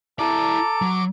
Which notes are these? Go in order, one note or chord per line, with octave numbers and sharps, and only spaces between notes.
E4 A4 D5 A#5 D6
F#3